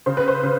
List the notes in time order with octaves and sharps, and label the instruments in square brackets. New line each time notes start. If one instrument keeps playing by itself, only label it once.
[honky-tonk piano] C#3 C5
B4
C5
C#3